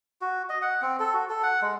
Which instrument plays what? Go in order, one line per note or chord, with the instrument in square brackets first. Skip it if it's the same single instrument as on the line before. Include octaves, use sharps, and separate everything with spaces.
[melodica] F#4
D#5
F#5
C4
A4
F#4
A4
F#5
G#3